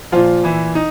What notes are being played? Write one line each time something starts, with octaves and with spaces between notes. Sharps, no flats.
A#2 F3 F4
E3 E4
D#4